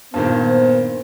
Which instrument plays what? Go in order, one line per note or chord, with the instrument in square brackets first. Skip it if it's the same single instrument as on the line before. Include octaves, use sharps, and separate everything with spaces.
[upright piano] G2 A#2 D#3 [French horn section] B3 C5